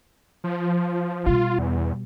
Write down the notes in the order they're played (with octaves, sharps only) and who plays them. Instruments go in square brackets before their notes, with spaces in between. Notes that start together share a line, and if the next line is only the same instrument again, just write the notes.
[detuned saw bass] F3
[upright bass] B2 G3 [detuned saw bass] F4
[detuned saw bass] E2